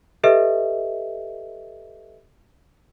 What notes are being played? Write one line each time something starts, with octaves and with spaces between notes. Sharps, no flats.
G4 A4 B4 D#5 E5